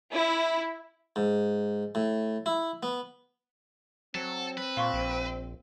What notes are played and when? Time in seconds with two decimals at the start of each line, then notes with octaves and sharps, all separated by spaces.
0.12 E4
1.16 G#2
1.95 A2
2.46 E4
2.83 B3
4.15 F#3 C4 A4
4.57 B4
4.77 A#2 F5 C6 C#6
4.94 A#1